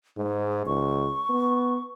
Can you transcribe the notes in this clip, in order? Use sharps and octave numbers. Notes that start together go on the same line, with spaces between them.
G#2 G#3
C#2 C#6
B3